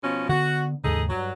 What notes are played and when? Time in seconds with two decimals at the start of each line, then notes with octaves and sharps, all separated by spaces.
0.03 B2 F3 C#4
0.29 D3 B3 F#4
0.84 D#2 G#2 C#3 D#4 G#4 A4
1.09 G2 F#3